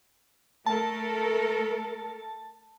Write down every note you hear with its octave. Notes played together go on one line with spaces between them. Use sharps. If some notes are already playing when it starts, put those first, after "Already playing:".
A3 A4 A#4 A5